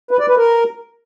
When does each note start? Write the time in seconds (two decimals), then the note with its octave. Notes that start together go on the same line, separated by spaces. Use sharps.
0.11 B4
0.20 D5
0.28 B4
0.37 A#4